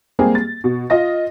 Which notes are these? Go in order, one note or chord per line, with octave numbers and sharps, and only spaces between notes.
G3 G#3 A#3 C4 G4 G#4
A6
B2
F4 D#5 A#6